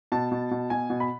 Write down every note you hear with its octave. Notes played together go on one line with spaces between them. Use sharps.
B2 A5
B2
B2
B2 G#5
B2
B5